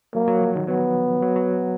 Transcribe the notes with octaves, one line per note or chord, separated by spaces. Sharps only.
F#3 A#3
F#3
F3
D#3
F#3 B3
F#3
F#3